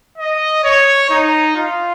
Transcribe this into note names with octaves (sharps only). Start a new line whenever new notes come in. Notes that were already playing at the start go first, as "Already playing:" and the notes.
D#5
C#5
D#4
F4